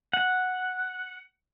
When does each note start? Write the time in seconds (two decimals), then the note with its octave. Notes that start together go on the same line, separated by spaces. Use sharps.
0.13 F#5